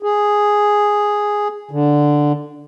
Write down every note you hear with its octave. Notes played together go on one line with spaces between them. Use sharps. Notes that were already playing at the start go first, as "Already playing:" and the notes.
G#4
D3